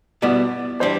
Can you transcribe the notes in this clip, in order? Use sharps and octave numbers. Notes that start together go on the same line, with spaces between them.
B2 G3 B3 E4 D5
E3 G3 D4 C5